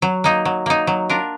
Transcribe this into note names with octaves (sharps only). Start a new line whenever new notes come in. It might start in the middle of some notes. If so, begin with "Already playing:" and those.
F#3
A#3 D#4
F#3
A#3 D#4
F#3
D4 F4 A#4